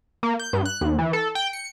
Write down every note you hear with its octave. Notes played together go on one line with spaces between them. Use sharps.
A#3
G6
G2
F#6
D#2
E3
A4
G5
C#7